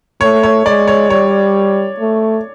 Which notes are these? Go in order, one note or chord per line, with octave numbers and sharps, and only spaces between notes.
A3 C#5
C#5
G#3 D5
C#5
G3 C#5
A3